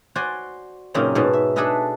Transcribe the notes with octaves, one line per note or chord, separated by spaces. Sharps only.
F#4 C5 D5 G#5
F#2 A#2 C#3 C4 D#4
G#2 B2 A5
E5
D4 G#4 A4 B4 D#5 E5